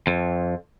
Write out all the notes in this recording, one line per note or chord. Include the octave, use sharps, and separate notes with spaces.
F2